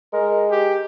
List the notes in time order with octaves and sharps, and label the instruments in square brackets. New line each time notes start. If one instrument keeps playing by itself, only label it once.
[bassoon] G#3 [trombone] A#4
[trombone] G4